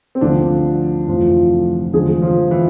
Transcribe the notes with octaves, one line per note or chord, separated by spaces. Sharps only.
C4
D2 D3 F3 D4
F1 F2 E3 F3 F4
E2 D3 F3 G#3 G#4
F3 F4
E3 E4